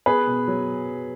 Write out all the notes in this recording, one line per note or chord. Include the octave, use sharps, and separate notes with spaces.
B3 G#4 B4
B2
F#3